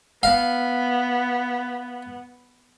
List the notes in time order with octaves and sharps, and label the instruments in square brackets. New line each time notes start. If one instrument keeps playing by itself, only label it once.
[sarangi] B3 [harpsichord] F5